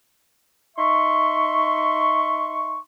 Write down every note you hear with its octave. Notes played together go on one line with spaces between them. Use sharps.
D#4 E5 C6 C#6